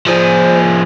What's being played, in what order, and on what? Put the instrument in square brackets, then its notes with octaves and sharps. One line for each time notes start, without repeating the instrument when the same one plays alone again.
[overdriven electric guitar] F3 G#4 [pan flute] C5